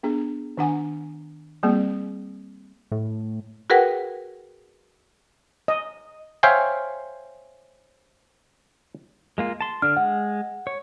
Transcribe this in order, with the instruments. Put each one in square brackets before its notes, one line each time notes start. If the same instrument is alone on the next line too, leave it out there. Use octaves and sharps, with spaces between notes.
[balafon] B3 D4 G#4
D#3 D4 F#5 G#5
G3 A#3 C4 G#4
[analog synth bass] A2
[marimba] F#4 G#4 A#4 B4 F#5 G5
[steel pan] D#5
[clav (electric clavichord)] C5 C#5 E5 F5 G5 G#5
[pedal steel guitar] G#3 A#3 F4
A5 C6
[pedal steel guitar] D3 D4 [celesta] F6
[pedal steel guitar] G#3 [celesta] F#5
[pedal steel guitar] C#5